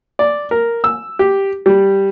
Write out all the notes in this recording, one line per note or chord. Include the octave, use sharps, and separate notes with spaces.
D5
A#4
E6
G4
G3